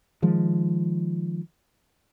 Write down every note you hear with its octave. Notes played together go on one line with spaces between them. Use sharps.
D#3 F3 G#3